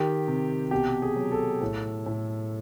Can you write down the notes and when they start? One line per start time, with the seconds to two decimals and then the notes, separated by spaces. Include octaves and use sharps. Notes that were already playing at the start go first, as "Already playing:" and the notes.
Already playing: D#3 G4
0.27 C3
0.71 B2 G4
1.02 G#4
1.16 F#3
1.32 A4
1.61 A2
2.06 A2